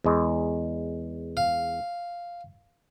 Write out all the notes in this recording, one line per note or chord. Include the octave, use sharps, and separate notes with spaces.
E2 G#3
F5